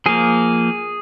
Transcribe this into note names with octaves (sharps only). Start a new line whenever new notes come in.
F3 A#3 G#4